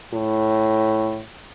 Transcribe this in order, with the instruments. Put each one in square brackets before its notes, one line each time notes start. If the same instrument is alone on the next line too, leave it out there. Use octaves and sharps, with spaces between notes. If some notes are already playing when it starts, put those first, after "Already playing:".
[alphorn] A2